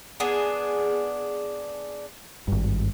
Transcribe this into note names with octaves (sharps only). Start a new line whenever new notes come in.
B3 D4 G#4
G#1 G2